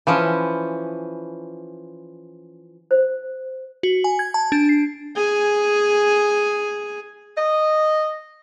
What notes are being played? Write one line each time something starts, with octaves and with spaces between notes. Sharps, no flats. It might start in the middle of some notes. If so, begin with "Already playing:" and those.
E3 F3 C#4
C5
F#4
G#5
G#6
A5
D4
C7
G#4 G#5
D#5